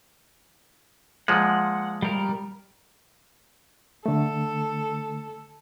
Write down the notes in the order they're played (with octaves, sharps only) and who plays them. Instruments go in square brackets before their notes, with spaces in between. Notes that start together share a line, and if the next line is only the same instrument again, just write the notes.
[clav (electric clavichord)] A#2 F3 G#3 [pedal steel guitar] F#5
[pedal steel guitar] G3 A#4
[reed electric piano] D3 A3 [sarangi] A4